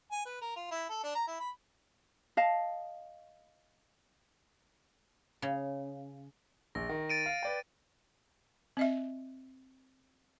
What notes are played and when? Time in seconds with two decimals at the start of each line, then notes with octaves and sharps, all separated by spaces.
0.12 G#5
0.26 B4
0.42 A#4
0.56 F4
0.71 E4
0.90 A4
1.04 D4
1.15 A#5
1.28 E4
1.40 B5
2.37 D#5 F5 A5
5.42 C#3
6.75 A#1 A#6
6.89 D#3
7.10 A6 D7 D#7
7.26 F5
7.43 B4 D5 G5
8.77 C4 D#5 E5